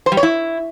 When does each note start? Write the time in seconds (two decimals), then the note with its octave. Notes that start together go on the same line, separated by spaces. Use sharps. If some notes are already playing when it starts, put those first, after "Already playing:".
0.06 C5
0.12 G3
0.17 C#5
0.23 E4